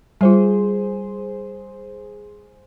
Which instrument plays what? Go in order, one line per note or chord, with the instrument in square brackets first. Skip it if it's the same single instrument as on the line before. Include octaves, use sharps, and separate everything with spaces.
[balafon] G3 F4 [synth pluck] G#4 C5